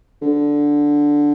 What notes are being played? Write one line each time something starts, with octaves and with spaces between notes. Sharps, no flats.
D3